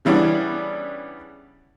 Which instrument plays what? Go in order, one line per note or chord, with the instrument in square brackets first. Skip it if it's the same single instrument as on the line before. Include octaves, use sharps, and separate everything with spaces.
[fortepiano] C#3 E3 G3 B3 C#4 D4